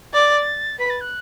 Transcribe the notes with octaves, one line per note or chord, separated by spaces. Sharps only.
D5 A6
B4 B6
A6
F#6